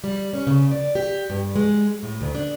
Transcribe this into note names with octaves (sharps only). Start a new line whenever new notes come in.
G3
C#4
C#3
D5
G4
G2
G#3
A2
D2
D4